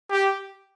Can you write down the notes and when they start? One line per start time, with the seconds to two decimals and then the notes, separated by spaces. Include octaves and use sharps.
0.10 G4